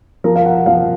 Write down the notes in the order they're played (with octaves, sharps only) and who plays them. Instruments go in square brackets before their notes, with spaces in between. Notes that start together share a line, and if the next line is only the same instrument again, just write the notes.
[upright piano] F3 A#4
F5
F#5
F3 F5